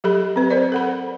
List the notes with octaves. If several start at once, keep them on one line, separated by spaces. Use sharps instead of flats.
F#3 G4 A4 B5
C4 B4
A#4 C5 D5
A4 F#5 B5